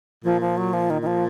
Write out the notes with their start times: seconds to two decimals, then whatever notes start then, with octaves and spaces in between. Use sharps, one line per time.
0.24 A#2 F3
0.41 F3
0.57 F#3
0.73 F3
0.90 D#3
1.02 D#3
1.07 F3